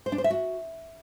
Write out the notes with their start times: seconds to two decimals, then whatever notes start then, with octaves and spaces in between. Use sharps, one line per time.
0.06 C5
0.12 D4
0.18 C5
0.24 E5
0.30 F#4